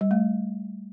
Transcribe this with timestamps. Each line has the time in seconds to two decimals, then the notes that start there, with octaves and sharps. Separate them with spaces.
0.01 G3
0.11 A3